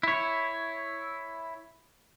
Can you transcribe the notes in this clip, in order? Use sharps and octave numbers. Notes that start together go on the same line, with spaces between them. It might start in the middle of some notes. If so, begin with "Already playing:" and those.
E4 C#5